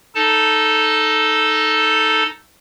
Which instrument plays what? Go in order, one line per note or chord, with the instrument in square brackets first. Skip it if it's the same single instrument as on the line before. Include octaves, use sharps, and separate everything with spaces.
[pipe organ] D#4 A4 A5